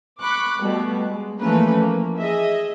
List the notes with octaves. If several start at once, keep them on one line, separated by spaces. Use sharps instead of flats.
B5 C#6 D6 F#6
B2 G3 A3
G#3
E3 F3 A3 A#3 C#4 B4
A#3
G#4 D#5 E5